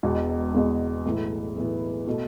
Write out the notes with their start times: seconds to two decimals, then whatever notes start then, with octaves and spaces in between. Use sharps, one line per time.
0.03 E1 E2 B2 G#3
0.54 E1 E2 B2 G#3
1.05 B1 A2 E3 B3 E4
1.56 B1 A2 E3 B3 E4
2.08 B2 A3